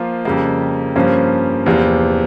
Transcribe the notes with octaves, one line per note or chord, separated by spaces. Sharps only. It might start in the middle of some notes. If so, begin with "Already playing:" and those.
Already playing: F3 A#3 F4
F2 C#3 G3 A#3
G2 F3 A#3 C#4
E2 C3 F3 A#3